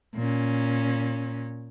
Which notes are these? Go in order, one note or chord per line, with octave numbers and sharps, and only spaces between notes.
A#2 C#4